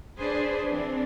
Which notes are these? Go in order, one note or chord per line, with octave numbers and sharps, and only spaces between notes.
D4 G#4 B4 C5
E3 C4 D4